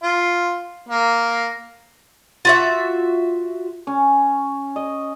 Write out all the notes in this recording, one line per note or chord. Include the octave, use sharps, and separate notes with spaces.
F4
A#3
F4 F#4 E5
C#4
D#5